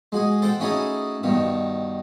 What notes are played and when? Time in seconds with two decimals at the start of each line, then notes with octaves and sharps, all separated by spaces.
0.12 G#3 F#4 G#4
0.42 A4 C5 F#5 G5
0.60 A3 C#4 D#4 E4 F#4 G#4
1.23 G2 B2 D#3